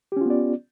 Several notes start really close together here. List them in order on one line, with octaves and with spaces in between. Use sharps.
G4 C#4 F4 B3 D5